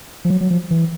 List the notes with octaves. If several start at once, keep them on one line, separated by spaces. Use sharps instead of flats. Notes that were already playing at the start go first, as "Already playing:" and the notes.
F3
F#3
F#3
F3
E3